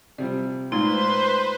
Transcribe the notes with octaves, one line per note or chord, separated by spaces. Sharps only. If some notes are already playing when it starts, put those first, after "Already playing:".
C3 F3 G3 D5
A#2 G#3 A3 D#4 B4 C5 C6